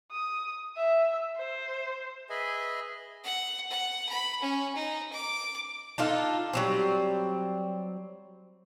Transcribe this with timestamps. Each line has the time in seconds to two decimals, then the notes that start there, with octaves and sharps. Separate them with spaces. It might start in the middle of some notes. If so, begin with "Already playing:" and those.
0.11 D#6
0.77 E5
1.37 C5
2.30 G#4 B4 D#5 E5 G#5
3.24 F#5
3.70 F#5
4.09 B5
4.42 C#4
4.75 D#4
5.12 D6
5.98 D4 D#4 F4 A4
6.53 F#3 G3 C4